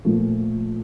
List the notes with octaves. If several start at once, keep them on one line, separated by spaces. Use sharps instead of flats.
A#2 F3 A3